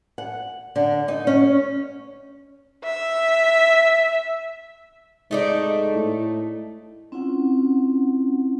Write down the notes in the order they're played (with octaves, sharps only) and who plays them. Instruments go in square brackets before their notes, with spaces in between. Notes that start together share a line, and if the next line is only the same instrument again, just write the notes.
[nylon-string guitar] F#5
D3
D#4
C#4
[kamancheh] E5
[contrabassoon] G#2 [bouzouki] A3 D#4 D5
[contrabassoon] A2
[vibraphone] C4 C#4 E4 F4 F#5